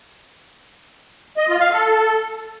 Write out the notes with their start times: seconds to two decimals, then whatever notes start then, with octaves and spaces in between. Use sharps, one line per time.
1.37 D#5
1.49 F4
1.60 F5
1.71 A4